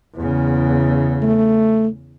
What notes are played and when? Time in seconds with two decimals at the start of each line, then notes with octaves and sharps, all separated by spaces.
0.16 E2 C#3
1.22 A3